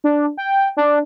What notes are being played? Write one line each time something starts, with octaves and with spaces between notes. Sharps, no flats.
D4
G5
D4